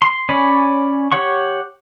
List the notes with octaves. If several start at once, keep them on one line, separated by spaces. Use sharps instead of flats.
C6
C#4 C#5 D5 G#5 B5
G4 C#5 F#5 C#6